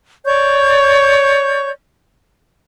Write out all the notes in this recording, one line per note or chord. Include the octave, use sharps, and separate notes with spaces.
C#5 D5 C#6 G6